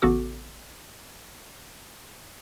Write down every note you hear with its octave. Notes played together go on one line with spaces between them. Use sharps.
A1 C#3 B3 F#4 A4 D6